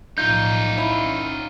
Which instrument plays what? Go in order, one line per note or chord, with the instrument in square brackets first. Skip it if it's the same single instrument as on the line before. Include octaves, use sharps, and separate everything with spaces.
[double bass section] B1 A2 F3 [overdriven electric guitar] D#4 F4 [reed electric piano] G6
[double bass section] C#4 [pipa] E4